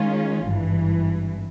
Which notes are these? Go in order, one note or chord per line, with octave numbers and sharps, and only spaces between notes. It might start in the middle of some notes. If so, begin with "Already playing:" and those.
Already playing: D#3 G#3 C#4 F4
G#1 G2 E3